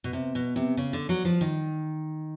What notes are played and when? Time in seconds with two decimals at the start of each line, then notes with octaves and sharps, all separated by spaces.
0.04 B2
0.13 C3
0.35 B2
0.56 C3
0.77 C#3
0.93 D3
1.09 F#3
1.25 F3
1.41 D#3